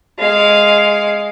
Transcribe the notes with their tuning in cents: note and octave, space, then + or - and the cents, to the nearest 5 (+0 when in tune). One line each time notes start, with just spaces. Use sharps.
G#3 +0 F5 +0